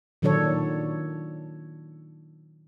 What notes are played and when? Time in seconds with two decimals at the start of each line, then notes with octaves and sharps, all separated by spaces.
0.22 A#2 D#3 F#3 D4 A4 C#5